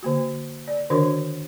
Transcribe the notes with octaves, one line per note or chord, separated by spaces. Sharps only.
D3 A#3 F#4
D5
D3 D#3 D4 F#4 A#4